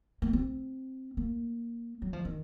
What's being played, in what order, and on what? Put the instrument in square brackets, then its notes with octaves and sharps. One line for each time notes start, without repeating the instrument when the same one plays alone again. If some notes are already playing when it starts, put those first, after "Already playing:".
[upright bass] A#3
C4
A#3
F#3
F3
D#3